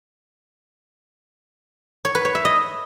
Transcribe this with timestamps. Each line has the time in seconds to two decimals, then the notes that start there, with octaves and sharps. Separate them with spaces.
2.05 C#5
2.15 B4
2.25 C#5
2.35 E5
2.45 D#5